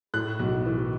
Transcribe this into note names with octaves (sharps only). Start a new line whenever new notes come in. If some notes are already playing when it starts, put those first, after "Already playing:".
A2 F#6
B1
E3